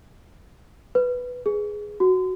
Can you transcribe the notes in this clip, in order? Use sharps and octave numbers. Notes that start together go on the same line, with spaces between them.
B4
G#4
F#4